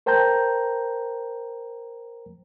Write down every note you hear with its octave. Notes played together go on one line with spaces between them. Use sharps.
A#4 C5 G5 A5 A#5 G6